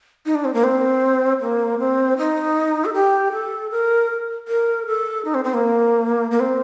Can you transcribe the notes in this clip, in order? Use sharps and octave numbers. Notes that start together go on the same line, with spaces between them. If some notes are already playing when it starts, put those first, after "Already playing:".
D#4
D4
C4
A#3
C4
A#3
C4
D#4
A4
G4
A4
A#4
A#4
A4
D#4
C4
C4
A#3
A#3
C4